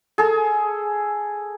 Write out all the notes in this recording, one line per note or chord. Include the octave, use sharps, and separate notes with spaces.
G#4 A4